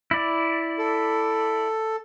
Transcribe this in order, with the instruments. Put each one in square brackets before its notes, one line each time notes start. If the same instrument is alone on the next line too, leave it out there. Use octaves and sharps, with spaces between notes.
[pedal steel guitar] E4 D5
[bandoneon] A4